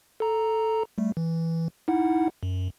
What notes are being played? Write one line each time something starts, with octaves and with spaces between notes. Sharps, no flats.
A4 A#5
G3 A3
E3
D#4 E4 F#5
F#2